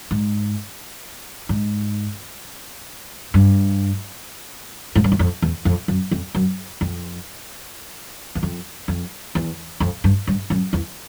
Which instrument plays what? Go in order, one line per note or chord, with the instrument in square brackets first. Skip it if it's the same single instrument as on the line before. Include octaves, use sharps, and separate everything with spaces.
[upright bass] G#2
G#2
G2
G#2
G2
F#2
F2
E2
F2
F#2
F2
F#2
F2
E2
F2
F2
E2
F2
G2
G2
F#2
E2